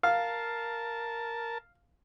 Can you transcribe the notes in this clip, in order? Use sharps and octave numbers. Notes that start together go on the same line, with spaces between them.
A#4 F5 A5